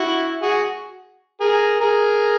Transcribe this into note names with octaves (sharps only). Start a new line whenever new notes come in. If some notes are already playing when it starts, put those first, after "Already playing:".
Already playing: E4 F#4
F#4 G#4
G#4 A#4
G#4 A#4